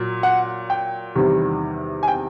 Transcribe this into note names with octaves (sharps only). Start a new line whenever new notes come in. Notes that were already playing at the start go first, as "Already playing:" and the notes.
Already playing: A#2 F#3
F#5
G5
E2 C3 D#3 G3
G#5
G5